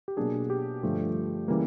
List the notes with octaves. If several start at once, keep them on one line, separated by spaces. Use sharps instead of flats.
G4
B2 F#3 A#3 D4 G#4
G4
G2 D3 F3 A3
C#3 E3 G3 A#3